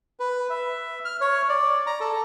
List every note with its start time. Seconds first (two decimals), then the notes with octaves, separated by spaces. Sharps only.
0.20 B4
0.50 E5
1.05 F6
1.21 C#5
1.49 D5
1.87 A#5
2.00 A4